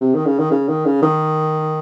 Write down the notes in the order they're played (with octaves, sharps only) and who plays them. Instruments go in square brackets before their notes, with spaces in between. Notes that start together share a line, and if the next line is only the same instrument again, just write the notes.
[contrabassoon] C3
D#3
C#3
D#3
C#3
D#3
C#3
D#3